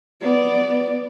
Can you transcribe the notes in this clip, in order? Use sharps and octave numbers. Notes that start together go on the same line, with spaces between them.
B3 D5